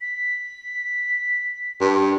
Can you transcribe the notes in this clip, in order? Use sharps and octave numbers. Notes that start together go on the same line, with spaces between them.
B6
G2